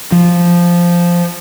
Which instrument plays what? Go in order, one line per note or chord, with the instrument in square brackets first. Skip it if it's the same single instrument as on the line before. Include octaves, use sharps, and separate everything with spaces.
[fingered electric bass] F3